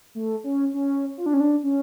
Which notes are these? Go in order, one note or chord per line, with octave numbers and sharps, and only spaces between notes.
A3
C#4
C#4
F4
D4
C#4
D4
C#4